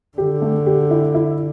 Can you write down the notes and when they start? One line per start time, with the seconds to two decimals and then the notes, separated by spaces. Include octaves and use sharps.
0.18 D3 G4
0.42 A3
0.66 G4
0.91 E4
1.14 E4